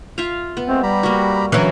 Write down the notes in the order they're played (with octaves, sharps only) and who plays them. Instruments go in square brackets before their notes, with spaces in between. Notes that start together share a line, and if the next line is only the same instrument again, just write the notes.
[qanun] F4 E5 F5
B3
[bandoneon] G#3 A3 [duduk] C4
[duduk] G3 [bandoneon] G4 A#5 B5
[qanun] A#3 F#4
[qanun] D3 C#4 [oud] E3 F#3